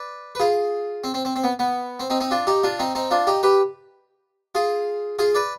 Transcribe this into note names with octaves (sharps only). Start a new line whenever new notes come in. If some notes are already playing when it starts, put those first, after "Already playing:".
Already playing: B4 D5
B4
F4 G#4
C4
C4
C4
C4
B3
B3
C4
C4 D#4
C4 D#4
D4 F4
D#4 G4
D4 F4
C4 D#4
C4 D#4
D4 F4
D#4 G4
G4 B4
F4 G#4
F4 G#4
B4 D5